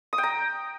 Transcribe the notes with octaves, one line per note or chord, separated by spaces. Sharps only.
D#6
G5
A#5